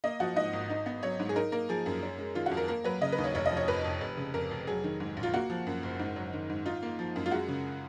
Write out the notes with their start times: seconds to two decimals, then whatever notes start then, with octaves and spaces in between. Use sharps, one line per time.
0.04 A#3 D#5
0.20 F3 F#4
0.36 G#2 D#5
0.53 G#1
0.70 D#4
0.86 B3
1.03 F#3 C#5
1.20 G#2
1.29 G#4
1.36 D#4 A#4
1.52 A#3 A#4
1.69 F3 G#4
1.86 F#2
2.03 C#4
2.18 G#3
2.35 D#3 F4
2.46 F#4
2.51 F2
2.57 A#4
2.68 A#3 A#4
2.84 F#3 B4
3.01 C#3 D#5
3.12 B4
3.18 D#2
3.24 C#5
3.35 F1 C#5
3.46 D#5
3.51 F3
3.57 C#5
3.68 F2 B4
3.84 F1
4.01 F1
4.17 C#3
4.34 F2 A#4
4.51 F1
4.67 F#3 G#4
4.84 D#3
5.00 G#2
5.17 A#1
5.23 F4
5.33 A#3 F#4
5.50 F3
5.67 F#2
5.83 F#1
5.99 G#2
6.16 F#3
6.33 D#3
6.50 G#2
6.65 D#4 F4
6.83 A#3
6.99 F3
7.16 F#2
7.26 F4
7.32 G#3 F#4
7.48 C#3